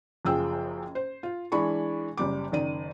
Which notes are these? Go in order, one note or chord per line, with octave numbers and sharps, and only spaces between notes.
F#1 F#2 F3 G#4 G5 E6
C5
F4
E3 G#3 D4 B5 C#6
F#1 G3 D6
F#1 D#3 D5 D#7